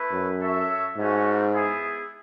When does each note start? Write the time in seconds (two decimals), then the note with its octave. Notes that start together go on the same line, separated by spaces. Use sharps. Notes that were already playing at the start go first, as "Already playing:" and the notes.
Already playing: A3 E4 B4
0.12 F#2
0.40 F#4 A4 C#5 E5
0.97 G#2 A3 C#4 F#4
1.53 B3 E4 G#4